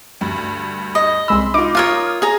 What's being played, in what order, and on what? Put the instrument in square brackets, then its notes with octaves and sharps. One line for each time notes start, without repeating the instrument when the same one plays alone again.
[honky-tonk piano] D2 G2
[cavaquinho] D#5
[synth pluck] C2 G#3 E6 [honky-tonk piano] B5 C6
[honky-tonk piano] D#4 F4 [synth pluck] D6
[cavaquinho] F4 A#4 C#5 [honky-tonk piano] D#6 F6
[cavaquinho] G#4 A#5